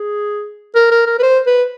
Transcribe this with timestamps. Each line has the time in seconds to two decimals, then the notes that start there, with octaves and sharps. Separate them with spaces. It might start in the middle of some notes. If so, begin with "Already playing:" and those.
Already playing: G#4
0.75 A#4
0.91 A#4
1.07 A#4
1.19 B4
1.23 C5
1.47 B4